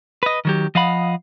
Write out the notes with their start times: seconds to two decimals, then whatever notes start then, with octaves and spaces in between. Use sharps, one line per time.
0.23 B4 D#5
0.45 D#3 F#3 G4
0.75 F3 D#5 F5 F#5 B5